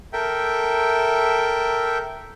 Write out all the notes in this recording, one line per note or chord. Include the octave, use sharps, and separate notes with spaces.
A4 A#4 E5 G5